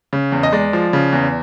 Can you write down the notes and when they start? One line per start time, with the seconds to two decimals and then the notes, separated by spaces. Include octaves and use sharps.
0.13 C#3
0.32 E2
0.43 D#5
0.53 G#3 D5
0.73 F3
0.93 C#3
1.12 E2